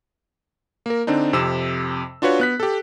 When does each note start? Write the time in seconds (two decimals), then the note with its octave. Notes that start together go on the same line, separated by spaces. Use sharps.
0.86 A#3 A#4
1.07 D3 C4 D4 D#4
1.33 F2 C3 E6 E7
2.22 D4 F4 F#4 B4 C#5
2.40 B3 F#6 B6
2.60 G4 A4